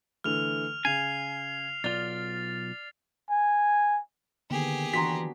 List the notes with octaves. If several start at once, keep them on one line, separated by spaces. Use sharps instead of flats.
D3 E3 A3 F6 F7
C#3 G#5 C7 F7
B1 F4 D5 A6
G#5
D3 D#3 A#3 B3 G4 G#4
D3 E3 D4 F#4 A#5 C6 B6